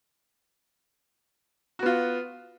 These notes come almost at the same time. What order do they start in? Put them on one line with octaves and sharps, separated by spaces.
F#4 B3 F4